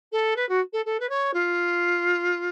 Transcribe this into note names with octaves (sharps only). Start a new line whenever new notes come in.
A4
B4
F#4
A4
A4
B4
C#5
F4